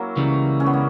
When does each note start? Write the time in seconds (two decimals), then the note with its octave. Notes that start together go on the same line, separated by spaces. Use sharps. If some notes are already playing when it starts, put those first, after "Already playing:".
Already playing: F#3 A#3 C#4 E4
0.16 C#2 C#3 E3 G3
0.60 C#4
0.66 B3
0.73 A#3